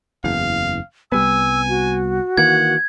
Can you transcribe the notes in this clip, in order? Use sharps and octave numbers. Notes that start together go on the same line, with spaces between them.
F#1 E2 F5
C2 G3 B3 G#5 E6
F#4
D#3 E3 A#3 F#5 G#6